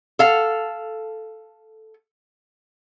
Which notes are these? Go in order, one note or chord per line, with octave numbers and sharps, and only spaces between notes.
A4 F5